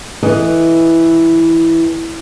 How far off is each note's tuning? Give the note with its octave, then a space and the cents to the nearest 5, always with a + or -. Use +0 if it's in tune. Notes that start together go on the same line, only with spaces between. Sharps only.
E3 +0 A4 +0 D#5 -5